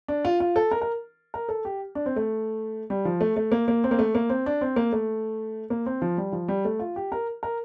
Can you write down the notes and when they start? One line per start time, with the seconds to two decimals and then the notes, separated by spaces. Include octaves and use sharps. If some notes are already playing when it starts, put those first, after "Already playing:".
0.08 D4
0.25 F4
0.40 F4
0.56 A4
0.71 A#4
0.82 A#4
1.34 A#4
1.49 A4
1.65 G4
1.95 D4
2.06 C4
2.16 A3
2.90 G3
3.05 F3
3.21 A3
3.36 A3
3.52 A#3
3.68 A#3
3.84 C4
3.91 A#3
3.99 A3
4.15 A#3
4.30 C4
4.46 D4
4.61 C4
4.76 A#3
4.92 A3
5.70 A#3
5.86 C4
6.02 F3
6.17 G3
6.33 F3
6.48 G3
6.65 A3
6.79 F4
6.96 G4
7.12 A#4
7.43 A#4